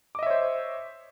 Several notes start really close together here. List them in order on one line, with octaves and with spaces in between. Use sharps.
D6 D#5 E5 C#5 C5